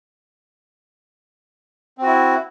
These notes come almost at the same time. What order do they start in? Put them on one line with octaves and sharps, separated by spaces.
C4 F#4 E4